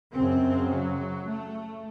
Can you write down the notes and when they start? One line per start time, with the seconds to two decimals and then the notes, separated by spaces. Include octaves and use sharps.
0.15 F#2 C#3 C4
0.71 F#3
1.27 A3